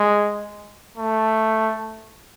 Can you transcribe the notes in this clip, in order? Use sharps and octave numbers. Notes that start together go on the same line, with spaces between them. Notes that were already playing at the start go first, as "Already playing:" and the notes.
Already playing: G#3
A3